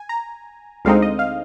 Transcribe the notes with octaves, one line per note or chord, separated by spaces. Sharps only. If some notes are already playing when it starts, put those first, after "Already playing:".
Already playing: G#5
A#5
D2 D3 G#3 C4 D#4 F5
D#5
F5